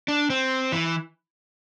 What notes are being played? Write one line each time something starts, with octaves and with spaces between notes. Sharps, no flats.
D4
C4
E3